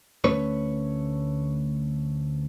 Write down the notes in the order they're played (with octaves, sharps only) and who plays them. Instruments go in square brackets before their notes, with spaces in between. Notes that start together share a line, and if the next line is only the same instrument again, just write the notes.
[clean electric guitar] D2 A3 C#4 B4 C#5